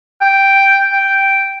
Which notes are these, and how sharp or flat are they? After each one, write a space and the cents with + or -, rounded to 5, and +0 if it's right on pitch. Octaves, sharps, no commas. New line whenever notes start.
G5 +0
G5 -5